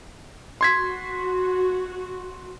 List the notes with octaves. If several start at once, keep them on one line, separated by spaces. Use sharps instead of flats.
F#4 C6 G#6 B6